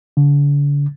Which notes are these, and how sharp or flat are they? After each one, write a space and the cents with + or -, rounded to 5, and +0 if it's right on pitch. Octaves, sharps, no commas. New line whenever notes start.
D3 -40